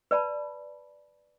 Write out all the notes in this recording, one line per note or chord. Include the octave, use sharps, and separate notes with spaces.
B4 D5 A5 B5